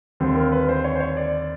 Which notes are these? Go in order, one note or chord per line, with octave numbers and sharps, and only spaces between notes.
D#2 D3 G3 C4
A#4
B4
C5
C#5
C5
C#5
D5